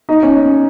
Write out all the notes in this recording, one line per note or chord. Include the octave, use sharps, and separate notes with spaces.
D#4
C#4